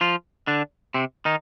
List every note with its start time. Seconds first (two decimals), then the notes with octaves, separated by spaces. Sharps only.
0.01 F3 F4
0.47 D3 D4
0.94 C3 C4
1.25 D#3 D#4